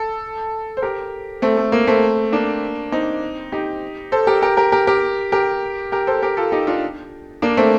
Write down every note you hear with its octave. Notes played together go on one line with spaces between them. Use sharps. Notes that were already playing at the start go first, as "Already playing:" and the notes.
Already playing: A4
C5
G4 A#4
A3 C4
A3
A#3
A3 C4
A#3 D4
C4 D#4
D#4 G4
A4 C5
G4 A#4
G4 A#4
G4 A#4
G4 A#4
G4 A#4
G4 A#4
G4 A#4
A4 C5
G4 A#4
F4 A4
D#4 G4
D4 F4
A#3 D4
A3 C4